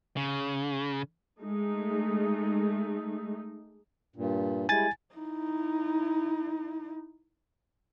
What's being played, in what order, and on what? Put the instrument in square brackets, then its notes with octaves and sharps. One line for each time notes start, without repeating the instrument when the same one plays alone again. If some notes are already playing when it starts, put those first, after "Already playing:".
[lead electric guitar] C#3
[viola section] G#3 A3 D#4
[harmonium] G2 A#2
[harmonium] G3 G#3 E4 [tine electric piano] G#5 A6
[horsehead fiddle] D#4 E4